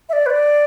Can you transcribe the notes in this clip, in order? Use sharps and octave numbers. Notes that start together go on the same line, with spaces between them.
E5
D5
B4
D5